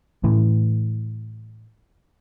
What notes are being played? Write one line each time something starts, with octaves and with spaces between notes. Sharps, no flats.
A2 E3